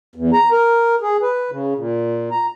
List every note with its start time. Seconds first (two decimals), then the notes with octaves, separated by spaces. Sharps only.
0.15 E2
0.33 A#5
0.52 A#4
1.02 G#4
1.22 B4
1.51 C#3
1.76 A#2
2.31 A#5